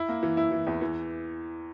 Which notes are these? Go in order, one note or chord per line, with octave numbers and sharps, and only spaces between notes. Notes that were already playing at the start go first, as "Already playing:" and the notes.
Already playing: E4
A#3
E3
E4
E3
E2
E3